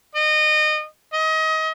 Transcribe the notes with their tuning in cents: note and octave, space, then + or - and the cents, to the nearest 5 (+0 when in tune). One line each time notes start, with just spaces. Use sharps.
D#5 -25
D#5 +30